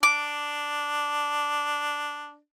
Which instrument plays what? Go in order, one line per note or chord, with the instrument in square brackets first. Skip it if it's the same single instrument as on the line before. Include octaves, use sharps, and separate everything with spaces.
[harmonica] D4 [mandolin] D6